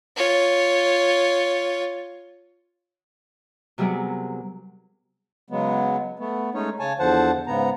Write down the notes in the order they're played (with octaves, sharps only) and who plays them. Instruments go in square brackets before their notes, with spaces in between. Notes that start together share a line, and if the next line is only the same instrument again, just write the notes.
[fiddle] F4 C#5
[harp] C3 F#3 G3 B3 G#4 A#4
[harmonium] C#3 F#3 G#3 B3
A3 B3
G#3 A3 C#4 D#4 C#5
C#3 C#5 G#5 A5
E2 D3 F3 C5 F#5 A5
G#2 C#3 B3 A#5